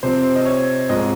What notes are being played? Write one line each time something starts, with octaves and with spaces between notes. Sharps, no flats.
C3 F3 C4 C5
D#5
C#5
G#2 F3 G#3 C4 D#5